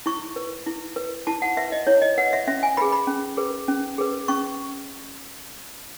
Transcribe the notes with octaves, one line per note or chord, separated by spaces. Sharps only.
E4 C#6
B4
E4
B4
E4 A5
F#5
B4 E5
D#5
E4 C#5
D#5
B4 F#5
E5
C#4 E5
G#5
G#4 B4 B5
B5
C#4
G#4 B4
C#4
G#4 B4
C#4 C#6